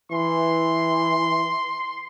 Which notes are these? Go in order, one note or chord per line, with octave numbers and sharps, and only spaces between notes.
E3 C6